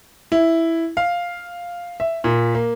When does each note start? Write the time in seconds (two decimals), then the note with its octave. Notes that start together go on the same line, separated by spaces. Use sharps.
0.32 E4
0.97 F5
2.00 E5
2.24 A#2
2.55 A#3